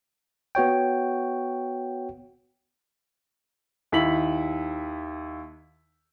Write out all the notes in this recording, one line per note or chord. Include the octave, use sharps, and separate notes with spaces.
B3 F#4 C#5 G5
D#2 E4 B6 F#7